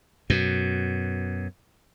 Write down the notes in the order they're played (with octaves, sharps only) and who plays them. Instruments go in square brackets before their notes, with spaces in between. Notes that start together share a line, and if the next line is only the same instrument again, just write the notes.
[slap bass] F#2 B2